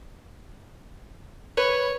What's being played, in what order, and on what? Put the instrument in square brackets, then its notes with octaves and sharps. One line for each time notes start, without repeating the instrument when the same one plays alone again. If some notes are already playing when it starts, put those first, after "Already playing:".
[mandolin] B4 [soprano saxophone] C#5